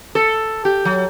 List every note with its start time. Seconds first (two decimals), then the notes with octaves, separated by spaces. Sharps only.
0.15 A4
0.65 G4
0.85 F#3